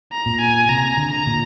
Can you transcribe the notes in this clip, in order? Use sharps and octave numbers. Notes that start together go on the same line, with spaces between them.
A#5
A#2
G#5
C3 A#5
D3
A#5
A#2